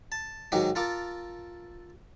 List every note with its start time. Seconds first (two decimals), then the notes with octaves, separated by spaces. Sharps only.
0.12 A5
0.52 G#2 D#3 F#3 F#4 G4
0.75 F4 A4 A#4 D6